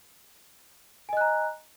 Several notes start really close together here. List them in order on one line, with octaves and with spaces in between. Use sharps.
G#5 D#5 F#6 A#5